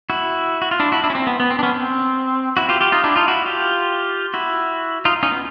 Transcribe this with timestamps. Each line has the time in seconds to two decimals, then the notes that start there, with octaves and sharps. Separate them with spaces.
0.10 E4 F#4
0.62 F#4
0.71 F4
0.80 D4 E4
0.92 E4 F#4
1.04 D4 E4
1.10 C#4
1.15 C4
1.27 B3
1.40 B3
1.51 C4
1.59 D4
1.63 B3 C#4
1.74 C4
2.57 E4 F#4
2.69 F4 G4
2.81 F4 G4
2.92 D#4 F4
3.04 D4 E4
3.16 D#4 F4
3.28 E4 F#4
3.46 F4 G4
4.34 E4 F#4
5.05 D#4 F4
5.23 C#4 D#4
5.31 B3